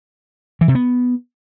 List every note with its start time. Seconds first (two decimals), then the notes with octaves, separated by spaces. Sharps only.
0.61 E3
0.68 C3
0.75 B3